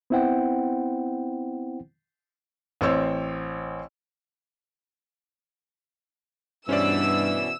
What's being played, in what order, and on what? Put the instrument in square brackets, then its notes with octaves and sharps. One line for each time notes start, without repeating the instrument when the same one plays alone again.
[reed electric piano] B3 C4 E4 C5 F#5 G5
[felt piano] A1 C4 C5 C#5 E6
[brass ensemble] G2 [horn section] B2 E3 [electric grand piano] C#4 C5 D5 [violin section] E6